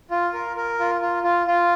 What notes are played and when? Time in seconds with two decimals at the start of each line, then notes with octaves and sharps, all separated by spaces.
0.11 F4
0.33 A#4
0.57 A#4
0.79 F4
1.01 F4
1.23 F4
1.47 F4